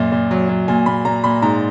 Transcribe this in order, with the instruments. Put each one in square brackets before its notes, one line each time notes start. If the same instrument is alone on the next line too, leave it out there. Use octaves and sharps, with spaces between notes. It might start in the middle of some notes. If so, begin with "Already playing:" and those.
Already playing: [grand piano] F#2 A#2
A#2
F#3
F#3
A#2 G#5
A#2 B5
A#2 A#5
A#2 B5
G#2 A#5